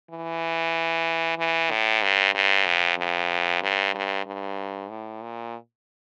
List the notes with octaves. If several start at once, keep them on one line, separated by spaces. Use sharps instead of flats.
E3
E3
A2
G2
G2
F2
F2
G2
G2
G2
A2
A#2